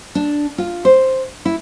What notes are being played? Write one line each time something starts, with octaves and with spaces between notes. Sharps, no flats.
D4
F4
C5
E4